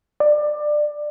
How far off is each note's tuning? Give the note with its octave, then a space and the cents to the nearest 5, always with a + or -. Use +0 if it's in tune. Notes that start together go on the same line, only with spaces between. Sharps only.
D5 +20